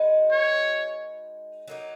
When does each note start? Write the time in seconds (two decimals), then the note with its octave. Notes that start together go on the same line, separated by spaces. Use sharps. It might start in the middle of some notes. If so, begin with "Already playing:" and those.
Already playing: G#3 D#4 F#4 B4
0.32 C#5
1.68 F#3 A#3 D#4